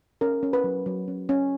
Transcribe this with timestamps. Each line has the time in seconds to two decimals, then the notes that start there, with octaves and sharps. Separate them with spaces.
0.21 C#4 A#4
0.43 C#4
0.53 B4
0.64 F#3
0.86 F#3
1.08 C#4
1.29 C#4